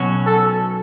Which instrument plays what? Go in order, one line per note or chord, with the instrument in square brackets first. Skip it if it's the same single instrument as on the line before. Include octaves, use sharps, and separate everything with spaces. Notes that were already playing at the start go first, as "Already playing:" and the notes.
Already playing: [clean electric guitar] B1 B2 F#3 C#4 F#4
[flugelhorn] A4